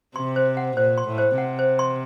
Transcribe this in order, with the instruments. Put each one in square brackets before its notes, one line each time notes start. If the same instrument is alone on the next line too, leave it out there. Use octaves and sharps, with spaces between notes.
[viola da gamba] C3 [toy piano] C6
[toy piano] C5
F#5
[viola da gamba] A#2 [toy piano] C5
[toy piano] C6
[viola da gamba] A2
[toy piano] C5
[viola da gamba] C3 [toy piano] F#5
[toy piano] C5
C6